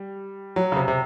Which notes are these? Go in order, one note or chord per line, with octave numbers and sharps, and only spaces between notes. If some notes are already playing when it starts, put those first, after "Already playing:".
Already playing: G3
F#3
C#3
C3
C3